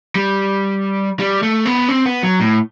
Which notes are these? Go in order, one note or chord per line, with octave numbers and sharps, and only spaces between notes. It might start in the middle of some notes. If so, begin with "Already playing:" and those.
G3
G3
A3
B3
C4
B3
F#3
A2